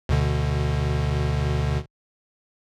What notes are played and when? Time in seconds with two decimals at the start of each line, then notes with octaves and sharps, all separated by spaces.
0.09 D2 B2 D3